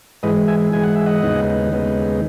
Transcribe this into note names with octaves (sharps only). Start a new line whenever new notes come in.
G#2 E3 G#3 B4 D#5
E5 G#5
G#2 E3 G#3 G#5
F#5
E5
D#5 F#5
D#2 C#3 G#3 B3 D#4
D#2 C#3 G#3 B3 D#4